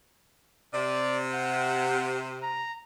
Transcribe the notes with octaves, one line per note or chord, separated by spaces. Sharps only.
C3 D5
F#5
A#5